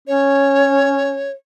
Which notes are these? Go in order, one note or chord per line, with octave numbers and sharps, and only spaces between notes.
C#4 C#5